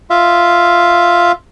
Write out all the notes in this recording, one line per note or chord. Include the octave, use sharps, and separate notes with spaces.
F4 E5 F5